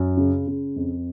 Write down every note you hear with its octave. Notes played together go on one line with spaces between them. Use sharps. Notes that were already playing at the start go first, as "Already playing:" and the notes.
Already playing: F#2
C#3
C#3
F2